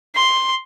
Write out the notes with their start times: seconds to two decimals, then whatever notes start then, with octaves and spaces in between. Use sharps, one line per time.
0.15 C6